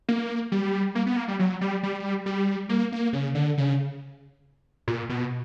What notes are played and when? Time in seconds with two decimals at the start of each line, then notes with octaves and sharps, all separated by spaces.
0.09 A#3
0.52 G3
0.95 A#3
1.06 B3
1.17 A#3
1.28 G3
1.39 F#3
1.61 G3
1.83 G3
2.26 G3
2.69 A#3
2.92 A#3
3.13 C#3
3.35 D3
3.58 C#3
4.88 A#2
5.09 B2